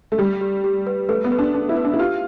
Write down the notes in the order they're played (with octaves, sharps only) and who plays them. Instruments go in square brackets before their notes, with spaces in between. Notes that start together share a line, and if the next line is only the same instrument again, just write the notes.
[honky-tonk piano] A3
[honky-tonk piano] G3 [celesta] G4
[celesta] G4
G4
B4
[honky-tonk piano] A3 [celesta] B4
[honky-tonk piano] B3
[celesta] B4
[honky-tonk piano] D4
[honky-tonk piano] D4 [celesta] B4
[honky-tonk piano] E4
[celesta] B4
[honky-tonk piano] D4
E4
[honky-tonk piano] F4 [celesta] G4